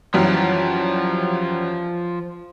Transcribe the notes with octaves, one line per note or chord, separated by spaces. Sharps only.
F#2 E3 F3 G3